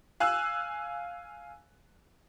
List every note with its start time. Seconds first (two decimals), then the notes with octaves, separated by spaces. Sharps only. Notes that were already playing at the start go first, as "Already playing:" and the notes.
0.20 F5 G#5 E6 F#6